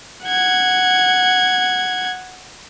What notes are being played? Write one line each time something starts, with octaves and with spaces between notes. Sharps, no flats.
F#5 G#6